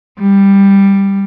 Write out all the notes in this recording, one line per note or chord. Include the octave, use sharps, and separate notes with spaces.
G3